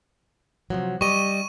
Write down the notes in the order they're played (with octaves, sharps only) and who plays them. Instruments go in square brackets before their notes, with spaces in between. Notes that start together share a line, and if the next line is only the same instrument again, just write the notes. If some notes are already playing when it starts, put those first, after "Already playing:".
[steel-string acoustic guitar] C3 F3 F#3
[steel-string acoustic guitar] G3 G4 D#5 [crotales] C#6 D#7